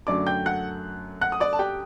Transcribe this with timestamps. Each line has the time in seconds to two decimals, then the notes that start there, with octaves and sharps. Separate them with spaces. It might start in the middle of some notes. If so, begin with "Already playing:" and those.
0.07 F#2 D3 F#3 A3 D5 D6
0.26 G5 G6
0.46 F#5 F#6
1.21 F#5 F#6
1.32 D#6
1.40 D5 D6
1.53 A5
1.59 G4 G5